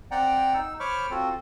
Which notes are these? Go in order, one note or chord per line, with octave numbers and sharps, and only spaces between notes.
C4 D5 F#5 G5 A#5
D#4 E6
C5 C#5 B5 C#6 D6 F6
C4 F4 F#4 A4